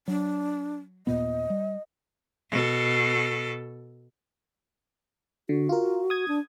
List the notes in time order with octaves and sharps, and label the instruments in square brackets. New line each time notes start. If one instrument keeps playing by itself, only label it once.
[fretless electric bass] F#3 [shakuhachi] D4
[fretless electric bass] D#2 A#2 B3 [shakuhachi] D#5
[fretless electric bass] G3
[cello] B2 A4
[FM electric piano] D3 [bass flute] F#4
[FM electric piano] F4 A#4
D#6 G#6
[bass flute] D4